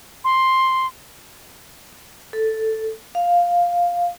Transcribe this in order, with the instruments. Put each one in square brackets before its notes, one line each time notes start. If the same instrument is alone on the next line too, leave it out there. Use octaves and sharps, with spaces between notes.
[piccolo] C6
[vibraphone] A4
F5